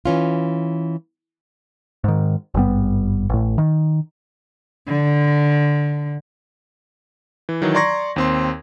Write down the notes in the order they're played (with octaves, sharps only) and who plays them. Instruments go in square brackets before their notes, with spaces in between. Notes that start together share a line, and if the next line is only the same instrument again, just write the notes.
[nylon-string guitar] E3 C#4 F4
[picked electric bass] G#2 D#3
G#1 G2 G3 B3
A1 A2
D#3
[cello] D3
[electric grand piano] E3
D#3 E3 F#3
D5 A#5 C6 C#6 G#6 A#6
D#2 C4 C6